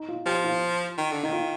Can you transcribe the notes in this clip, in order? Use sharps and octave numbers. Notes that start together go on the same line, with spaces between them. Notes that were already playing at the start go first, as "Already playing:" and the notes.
Already playing: D#4
F4
F3 G4
F4
D#3
D3
D#3 D#4
F4